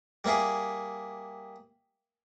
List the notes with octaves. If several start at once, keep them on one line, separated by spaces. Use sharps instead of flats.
G3 A#3 E4 G#4